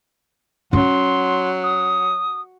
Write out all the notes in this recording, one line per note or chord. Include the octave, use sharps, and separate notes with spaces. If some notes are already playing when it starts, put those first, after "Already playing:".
F#3 C#4 C6
D#6